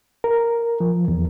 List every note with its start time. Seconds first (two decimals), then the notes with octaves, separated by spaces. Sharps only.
0.24 A#4
0.80 F3
1.08 E2